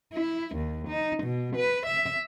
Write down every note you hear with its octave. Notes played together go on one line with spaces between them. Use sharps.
E4
D#2
D#4
B2
B4
E5